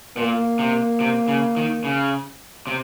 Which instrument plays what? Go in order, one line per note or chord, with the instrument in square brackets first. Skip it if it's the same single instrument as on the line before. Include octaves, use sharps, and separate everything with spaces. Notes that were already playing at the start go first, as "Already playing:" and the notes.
[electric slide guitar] A#2 [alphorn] A#3
[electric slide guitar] C3
C3
C#3
D#3
C#3
C3